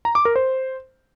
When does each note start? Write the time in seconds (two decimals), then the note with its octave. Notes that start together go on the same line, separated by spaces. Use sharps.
0.05 A#5
0.15 D6
0.25 A#4
0.36 C5